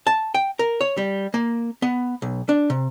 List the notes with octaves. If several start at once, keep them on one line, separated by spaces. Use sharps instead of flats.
A5
G5
A#4
C#5
G3
A#3
B3
B1
D4
C3